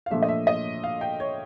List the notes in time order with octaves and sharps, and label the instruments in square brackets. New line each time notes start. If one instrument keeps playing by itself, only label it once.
[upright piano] F5
A#2 F3 A3 D4 E5
D#5
E5
D#5
F5
G5
C#5